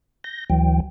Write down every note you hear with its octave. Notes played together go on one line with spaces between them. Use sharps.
G6 A#6
D2 E3 F#3 G5